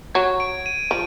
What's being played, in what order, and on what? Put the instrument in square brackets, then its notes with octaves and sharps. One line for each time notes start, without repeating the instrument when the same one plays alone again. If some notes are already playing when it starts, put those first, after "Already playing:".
[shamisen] F#3 [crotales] G#6
[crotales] D7
D#7
[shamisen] F3 [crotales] D7